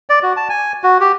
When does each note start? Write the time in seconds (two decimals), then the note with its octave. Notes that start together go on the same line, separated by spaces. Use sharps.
0.10 D5
0.23 F#4
0.37 A5
0.49 G#5
0.83 F#4
1.01 G4